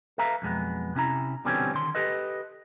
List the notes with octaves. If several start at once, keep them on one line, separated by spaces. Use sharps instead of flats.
A4 B4 E5 F5 A#5
B1 F2 G#3 B3
C3 C#4 E4 A#5
B2 D3 E3 G3 C4 C#4
D3 D#3 C6
G4 A4 B4 D#5